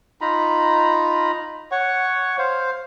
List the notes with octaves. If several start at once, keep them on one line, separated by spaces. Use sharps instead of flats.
D#4 F4 A#5 B5
C#5 F#5 C#6
C5 F5